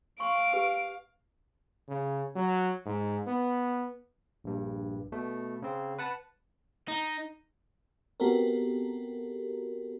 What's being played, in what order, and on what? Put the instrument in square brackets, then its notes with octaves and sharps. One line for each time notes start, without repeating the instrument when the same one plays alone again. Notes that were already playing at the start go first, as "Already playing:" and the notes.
[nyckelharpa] F5 [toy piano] C6 C#6 [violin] D7
[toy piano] G4 B4
[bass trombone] C#3
F#3
G#2
B3
[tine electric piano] A#1 G2
B2 A3
C#3 C4
B4 F#5 A5
[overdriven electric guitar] D#4
[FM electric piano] B3 C4 F#4 G4 A4 A#4